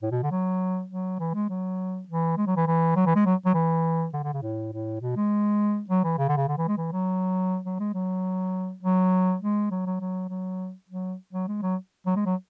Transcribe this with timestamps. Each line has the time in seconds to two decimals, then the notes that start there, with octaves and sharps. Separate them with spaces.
0.02 A2
0.12 B2
0.23 D3
0.31 F#3
0.90 F#3
1.19 E3
1.34 G#3
1.50 F#3
2.08 E3
2.38 G#3
2.47 F#3
2.57 E3
2.67 E3
2.96 F#3
3.06 E3
3.16 G#3
3.26 F#3
3.46 F#3
3.54 E3
4.13 D3
4.24 D3
4.33 C#3
4.42 A2
4.73 A2
5.01 B2
5.16 G#3
5.89 F#3
6.04 E3
6.18 C#3
6.29 D3
6.37 C#3
6.48 D3
6.58 E3
6.68 G#3
6.77 E3
6.92 F#3
7.65 F#3
7.80 G#3
7.94 F#3
8.83 F#3
9.42 G#3
9.71 F#3
9.86 F#3
10.00 F#3
10.29 F#3
10.89 F#3
11.33 F#3
11.48 G#3
11.62 F#3
12.06 F#3
12.16 G#3
12.26 F#3